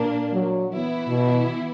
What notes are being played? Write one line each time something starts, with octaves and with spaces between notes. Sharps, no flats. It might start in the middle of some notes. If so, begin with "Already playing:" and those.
Already playing: A#2 A#3 D4
F#3
E3 B3 E4
B2